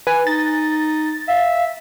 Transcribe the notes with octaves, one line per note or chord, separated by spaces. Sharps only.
B4 G#5
D#4 A6
E5 F5